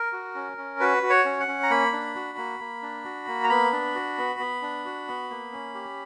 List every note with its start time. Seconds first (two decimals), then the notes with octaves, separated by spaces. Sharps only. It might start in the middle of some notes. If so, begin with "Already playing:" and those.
Already playing: A#4
0.12 F#4
0.35 C#4
0.57 C#4
0.80 F#4 B4
1.03 F#4
1.10 C#5
1.25 C#4
1.40 F#5
1.48 C#4
1.63 A#5
1.70 A#3 B5
1.92 D4
2.15 F#4
2.38 A#3
2.60 A#3
2.82 D4
3.05 F#4
3.27 A#3
3.44 A#5
3.49 B3 B5
3.72 D4
3.95 F#4
4.18 B3
4.39 B3
4.62 D4
4.85 F#4
5.08 B3
5.30 A#3
5.52 C#4
5.74 G4